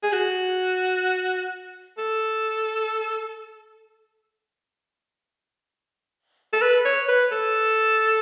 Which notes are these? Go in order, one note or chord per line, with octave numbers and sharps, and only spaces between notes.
G#4
F#4
A4
A4
B4
C#5
B4
A4